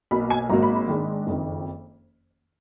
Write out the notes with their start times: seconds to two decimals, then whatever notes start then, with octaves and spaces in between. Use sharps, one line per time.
0.11 B1 B2 A#3 B5
0.30 G#5
0.49 G#1 G#2 F#3 A#3 A#5
0.63 B5
0.75 B5
0.88 G#2 D#3 G#3 D4
1.27 F#1 F2 D#3